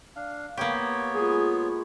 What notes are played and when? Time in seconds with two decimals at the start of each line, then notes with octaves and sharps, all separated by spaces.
0.16 D4 F5
0.57 A#3 B3 G4 C#5
1.15 G#3 F4 G#4